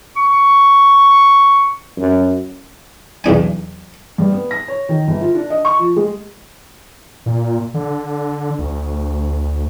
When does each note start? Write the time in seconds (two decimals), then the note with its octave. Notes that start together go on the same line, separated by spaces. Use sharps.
0.16 C#6
1.98 F#2
3.24 B1 E2 D4 G#5
4.18 G2
4.32 B3
4.51 A#6
4.68 C#5
4.89 D#3
5.07 G1
5.21 F4
5.35 D4
5.50 D#5
5.65 C#6
5.79 F3
5.96 G#3
7.26 A#2
7.74 D3
8.59 D2